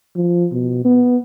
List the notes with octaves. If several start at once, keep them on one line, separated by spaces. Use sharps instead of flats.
F3
B2
B3